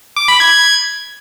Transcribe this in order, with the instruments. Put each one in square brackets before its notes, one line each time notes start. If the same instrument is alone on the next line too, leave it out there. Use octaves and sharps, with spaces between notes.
[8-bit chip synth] D6
B5
G#6